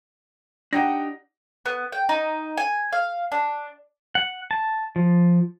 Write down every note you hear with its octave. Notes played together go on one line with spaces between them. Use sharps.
D4 D#4 G4 F#5 G5 A#6
B3
G5
D#4
G#5
F5
D4
F#5
A5
F3